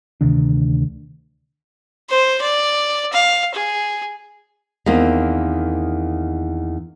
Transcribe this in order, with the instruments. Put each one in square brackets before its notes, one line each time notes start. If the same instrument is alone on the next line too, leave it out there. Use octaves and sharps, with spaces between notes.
[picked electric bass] D2 C3 D#3 D4
[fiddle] C5
D5
F5
G#4
[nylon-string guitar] E2 D#3 A#3 C4